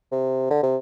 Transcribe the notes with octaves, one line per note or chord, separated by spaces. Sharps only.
C3
D3
C3